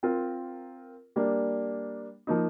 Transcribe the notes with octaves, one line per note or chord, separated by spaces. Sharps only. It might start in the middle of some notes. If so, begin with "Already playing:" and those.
C4 F4 A#4
G3 A#3 D4
F3 A#3 D#4